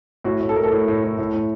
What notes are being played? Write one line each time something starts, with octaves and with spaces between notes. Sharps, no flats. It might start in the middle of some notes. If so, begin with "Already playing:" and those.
A2 F#4
A2
A4
A2 A#4
A4
A2
A2
A2
A2
A2